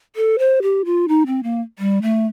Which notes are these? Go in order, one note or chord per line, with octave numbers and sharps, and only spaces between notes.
A4
C5
G4
F4
D#4
C4
A#3
G3
A3